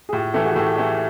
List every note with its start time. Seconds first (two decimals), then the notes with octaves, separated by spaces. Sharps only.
0.09 G#4
0.12 A2 F4 G4
0.34 E3 A3 G4 A4
0.44 F#4 G#4
0.55 A2 G4 A4
0.77 E3 A3